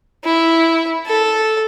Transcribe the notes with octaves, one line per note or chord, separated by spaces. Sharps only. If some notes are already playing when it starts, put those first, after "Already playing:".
E4
A4